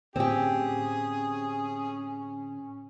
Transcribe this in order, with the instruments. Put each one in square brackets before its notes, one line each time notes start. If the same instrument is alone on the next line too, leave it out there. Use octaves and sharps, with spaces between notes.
[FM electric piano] A2 D3 [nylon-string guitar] C4 G4 [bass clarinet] C#4 [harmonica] G#4